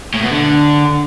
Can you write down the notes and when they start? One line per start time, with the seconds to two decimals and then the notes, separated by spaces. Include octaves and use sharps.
0.14 A2
0.22 B2
0.30 D3